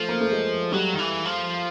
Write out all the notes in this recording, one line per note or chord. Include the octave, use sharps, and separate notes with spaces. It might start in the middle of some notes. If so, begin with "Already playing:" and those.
Already playing: F3 A3
A#3
A3
G#3
F#3 G3
D#3
E3
F3